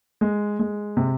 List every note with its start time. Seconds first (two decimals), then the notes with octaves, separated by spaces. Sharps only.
0.21 G#3
0.59 G#3
0.97 C3